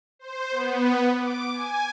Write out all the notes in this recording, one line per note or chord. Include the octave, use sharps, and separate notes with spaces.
C5
B3
D6
G#5